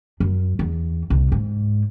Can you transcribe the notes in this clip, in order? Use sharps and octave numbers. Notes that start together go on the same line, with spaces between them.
F#2
E2
C2
G#2